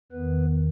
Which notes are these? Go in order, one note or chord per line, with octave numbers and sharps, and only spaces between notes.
E2 D#3 B3 B4